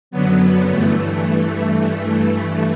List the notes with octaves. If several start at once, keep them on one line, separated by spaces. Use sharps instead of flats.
F#2 D3 F#3 B3
G2 E3 A3